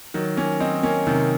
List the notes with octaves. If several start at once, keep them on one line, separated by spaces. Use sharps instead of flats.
D#3 F#3
A#3 C#4
C4 D#4
A#3 C#4
C3 D#3